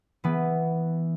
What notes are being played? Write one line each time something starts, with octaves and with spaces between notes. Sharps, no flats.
E3 B3